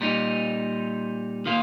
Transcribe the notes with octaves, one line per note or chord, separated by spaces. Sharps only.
A#2 G3 D#4
D#3 A#3 F4